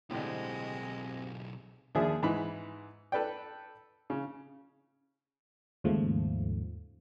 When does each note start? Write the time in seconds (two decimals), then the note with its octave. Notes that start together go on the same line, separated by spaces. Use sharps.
0.11 B1 A2 D3 G#3 C4 G4 D#5
1.95 D#2 F3 D4 G#4 E5 G#5
2.23 G#2 E3 B5
3.12 A4 B4 D5 G5
4.10 C#3
5.84 D#2 G#2 C#3 F3 A3